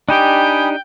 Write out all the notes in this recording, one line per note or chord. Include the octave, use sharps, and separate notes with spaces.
D4 D#4 G4 G5 G#5 B5 D#6